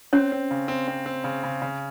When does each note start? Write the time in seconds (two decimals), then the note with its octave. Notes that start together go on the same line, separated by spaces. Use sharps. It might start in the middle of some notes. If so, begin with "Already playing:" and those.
0.13 C4 C#4 C#5
0.32 C4
0.51 C#3
0.68 C4
0.88 C4
1.06 C4
1.24 C#3
1.43 C#3
1.62 C#3